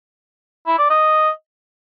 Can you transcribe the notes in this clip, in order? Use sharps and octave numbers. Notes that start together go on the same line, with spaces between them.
E4
D5
D#5